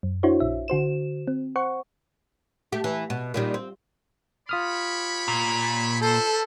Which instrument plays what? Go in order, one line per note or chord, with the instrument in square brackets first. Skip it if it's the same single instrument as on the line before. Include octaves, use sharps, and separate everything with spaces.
[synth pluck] F#2
D4 E4 F#4 C5 C#5
A#1 E5
D3 F#4 C5 E7
C4
C5 F#5 C#6
[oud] A3 G4
E3
B2
A#2 D#3 G3
C4
[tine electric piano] F4 D#6 F6 [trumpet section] G4 C#5 B5
[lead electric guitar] A#2
[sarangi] A4 [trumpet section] B4 C5